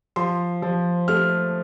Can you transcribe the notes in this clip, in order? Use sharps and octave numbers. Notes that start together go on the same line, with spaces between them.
F3 C6
F3
A3 F6